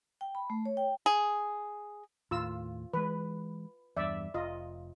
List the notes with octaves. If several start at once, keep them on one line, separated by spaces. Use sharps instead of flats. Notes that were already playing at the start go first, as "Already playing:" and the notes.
G5
B5
A3
C#5
G5
G#4
D#2 A2 F4 E6
E3 G#3 B4
E2 G2 D5 E5
F1 F4 D#5